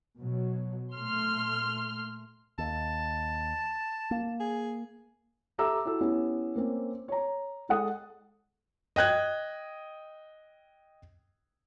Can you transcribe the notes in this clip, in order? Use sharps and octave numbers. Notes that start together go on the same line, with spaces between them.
B2 F#3
A#2 A3 C6 F6
D#2 A5
A#3
G#4
G4 A4 E5 A#5 D6 E6
E4 F#4 A4 E6
B3 C#4 E4 G4
A#3 C4 C#4
C#5 A#5
G#3 A4 F#5 D#6
D#5 G5 F#6 G#6